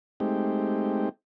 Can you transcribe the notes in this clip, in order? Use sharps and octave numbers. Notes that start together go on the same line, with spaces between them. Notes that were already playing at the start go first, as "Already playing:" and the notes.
G#3 A3 C4 D#4 G4